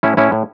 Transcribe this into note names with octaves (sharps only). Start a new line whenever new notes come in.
A2 C#4 E4
A2 C#4 E4
A2